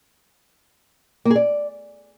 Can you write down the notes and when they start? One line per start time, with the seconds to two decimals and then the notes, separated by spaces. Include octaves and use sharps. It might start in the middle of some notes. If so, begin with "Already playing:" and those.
1.25 A#3
1.30 G#4
1.36 D5